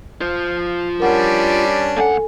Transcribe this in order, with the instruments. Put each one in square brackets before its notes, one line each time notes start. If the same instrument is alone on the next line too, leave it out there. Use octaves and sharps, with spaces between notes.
[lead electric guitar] F4 C5
[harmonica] G3 C#4 D4 [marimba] A#4 F#5
[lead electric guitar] D#2 F#5 [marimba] A4 G#5